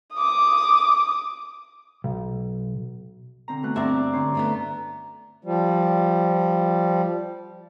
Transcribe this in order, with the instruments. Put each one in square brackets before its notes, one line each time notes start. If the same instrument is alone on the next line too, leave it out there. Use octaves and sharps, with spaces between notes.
[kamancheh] D6 D#6
[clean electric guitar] B1
[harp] D3 C4 A#5
B2 A3 F#6
[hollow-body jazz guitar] G2 C4 E5 [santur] D5 A#5
[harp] D3 C#4 C5
[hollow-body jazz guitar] G2 A3 B3
[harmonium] F3 G3